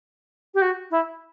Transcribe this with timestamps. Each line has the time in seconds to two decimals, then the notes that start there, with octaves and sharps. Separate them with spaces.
0.54 G4
0.61 F#4
0.90 E4